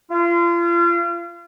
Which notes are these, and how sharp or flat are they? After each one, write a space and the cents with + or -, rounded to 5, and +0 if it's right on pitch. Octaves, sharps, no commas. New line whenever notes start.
F4 -35